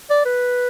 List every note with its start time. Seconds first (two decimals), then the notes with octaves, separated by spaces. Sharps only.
0.10 D5
0.25 B4